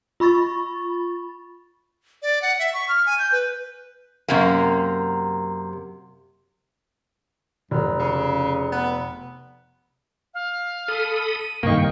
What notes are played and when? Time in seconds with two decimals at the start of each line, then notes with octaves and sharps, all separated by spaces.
0.20 F4 B5 C#6 A6
2.22 D5
2.42 F#5
2.59 E5
2.74 C#6
2.89 F6
3.06 G#5
3.19 G6
3.32 B4
4.28 F#2 C3 A#3
7.71 F1 F#2
7.99 C#3
8.72 B3
10.34 F5
10.88 A4 B5 D#6
11.38 D#7
11.63 G2 C3 D#3 A#3 G5 C#6